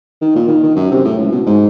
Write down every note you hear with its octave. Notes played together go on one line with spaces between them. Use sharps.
D#3
A#2
D#3
D#3
F#2
C3
A2
C#2
B2
G#2